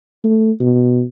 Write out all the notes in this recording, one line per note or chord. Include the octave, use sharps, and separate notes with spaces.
A3
B2